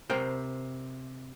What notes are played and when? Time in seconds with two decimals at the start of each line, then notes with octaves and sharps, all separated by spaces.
0.10 C3 A#4 C5 G5